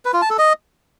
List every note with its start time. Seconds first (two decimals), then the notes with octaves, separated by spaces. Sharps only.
0.05 B4
0.13 F4
0.22 A5
0.30 A4
0.38 D#5